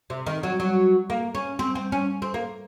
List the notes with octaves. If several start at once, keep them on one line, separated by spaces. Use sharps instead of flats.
C3
D#3
F#3
F#3
A#3
C#4
C4
C4
C#4
C4
A#3